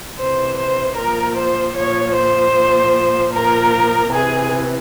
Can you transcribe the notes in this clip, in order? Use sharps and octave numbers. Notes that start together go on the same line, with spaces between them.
C3 E3 C5
C5
A#2 F3 A#4
C5
A#2 F3 C#5
C5
A#2 F3
A#2 F3 A#4
C3 E3 G#4